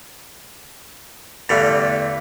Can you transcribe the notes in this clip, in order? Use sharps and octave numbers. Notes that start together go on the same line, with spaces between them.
E2 G2 D3 E3 A3